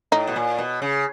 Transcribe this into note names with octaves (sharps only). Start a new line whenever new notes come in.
A2 D#4
B2
A#2
B2
C#3